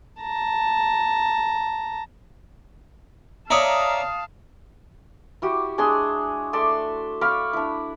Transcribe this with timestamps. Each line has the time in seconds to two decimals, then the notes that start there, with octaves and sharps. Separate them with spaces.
0.21 A5 A#5
3.50 C#5 D5 E5 F5 A5 A#5 D#6
5.42 E4 F#4 G4
5.78 G#3 D4 G#4 C6
6.53 A3 D5 E5 C6
7.21 D5 F5 B5 C#6
7.53 D4 E4